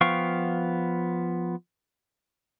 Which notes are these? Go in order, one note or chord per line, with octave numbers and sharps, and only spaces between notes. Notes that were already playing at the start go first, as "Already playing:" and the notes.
F3 B3 F5 G5 C#6